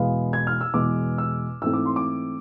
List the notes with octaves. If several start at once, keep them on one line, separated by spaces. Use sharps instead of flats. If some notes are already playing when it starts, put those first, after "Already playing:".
Already playing: E2 B2 G#3 B3 F5
G#6
F6
E6
E2 B2 G#3 B3 D6
E6
G#2 E3 A3 C4 E6
D6
C6
D6